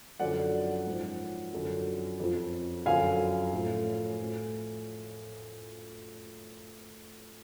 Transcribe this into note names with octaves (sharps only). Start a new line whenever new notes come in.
F#2 D3 F3 D5 F#5
G#2 F3
F#2 D3 F3
F2 F3
F#2 D3 F3 F5 G#5
A2 F3
A2 F3